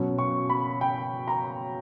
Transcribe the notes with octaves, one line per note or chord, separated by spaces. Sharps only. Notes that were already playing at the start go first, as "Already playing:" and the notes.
Already playing: B2 F#3 C#4
C#6
B5
G5
A#5